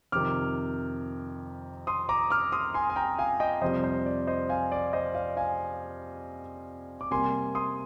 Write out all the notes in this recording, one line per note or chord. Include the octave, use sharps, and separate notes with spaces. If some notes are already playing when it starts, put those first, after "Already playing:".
F2 C3 D#3 D6 F6
C6 D#6
A#5 D6
D6 F6
C6 D#6
G#5 C6
G#5
G5 A#5
F5 G#5
D#5 G5
F2 C3 G3 C5 D#5
C5
D5
C5 D#5
F5 G#5
D5
C5 D#5
D5 F5
F5 G#5
D6
C3 G3 A#3 G#5 C6
C6 D#6